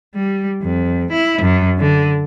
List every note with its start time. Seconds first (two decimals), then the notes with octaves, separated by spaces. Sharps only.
0.15 G3
0.62 F2
1.12 E4
1.42 F#2
1.78 D3